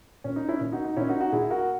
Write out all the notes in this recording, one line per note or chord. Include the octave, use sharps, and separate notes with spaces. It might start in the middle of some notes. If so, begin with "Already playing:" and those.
A#2 C#4
D#4
C#4 E4
A#2
D#4 F#4
D#4
A#2 C#4 E4
D#4 F#4
D#4 F#4
A#2 E4 G#4
F#4 A#4